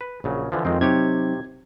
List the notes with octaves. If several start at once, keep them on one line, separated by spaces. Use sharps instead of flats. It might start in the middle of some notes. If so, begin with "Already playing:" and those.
B4
A#1 C#3 F#3
D3 E3 F3
F2 D#3 G#3 C4 F4
C3 F#3 C4 D#4 G4 C#5 G#6